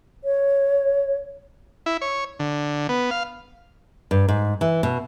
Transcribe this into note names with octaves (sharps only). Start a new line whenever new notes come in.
C#5
E4
C#5
D3
B3
F5
G2
G#2
E3
B2